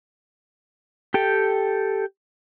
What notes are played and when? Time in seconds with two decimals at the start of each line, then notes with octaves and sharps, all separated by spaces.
1.14 G4 A4 G5